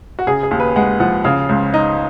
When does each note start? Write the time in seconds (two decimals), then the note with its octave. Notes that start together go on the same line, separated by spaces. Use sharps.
0.19 F#4
0.27 C#3 G#4
0.43 G#4
0.51 D#2
0.60 B4
0.76 G#3 F#5
1.00 F3 F#5
1.24 C#3 F5
1.49 C#2
1.74 D#4